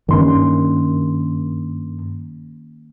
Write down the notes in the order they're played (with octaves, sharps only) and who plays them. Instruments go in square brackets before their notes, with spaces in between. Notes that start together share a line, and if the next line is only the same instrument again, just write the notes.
[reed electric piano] G2 C6 [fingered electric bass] D#3 A#3 C#4